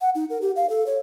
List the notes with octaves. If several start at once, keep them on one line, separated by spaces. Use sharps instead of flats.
F#5
D#4
A#4
G4
F5
A4
C#5